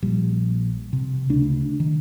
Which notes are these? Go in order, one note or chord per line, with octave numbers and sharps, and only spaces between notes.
A#1 G3
C3
D2 C#3 D4
D#3